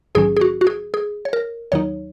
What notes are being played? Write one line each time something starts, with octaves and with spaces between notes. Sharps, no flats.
A#1 G#2 D#3 F#3 C#4 G#4
G#4
F#4
F#4
G#4
G#4
C#5
A#4
D#2 D#3 F#3 D#4 C#5